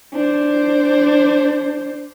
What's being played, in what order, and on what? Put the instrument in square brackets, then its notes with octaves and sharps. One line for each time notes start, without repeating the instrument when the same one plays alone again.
[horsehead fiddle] D4 C5